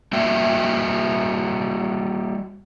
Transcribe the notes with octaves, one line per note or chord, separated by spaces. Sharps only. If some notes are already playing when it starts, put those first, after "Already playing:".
G3 A#3 F#4 E5 G5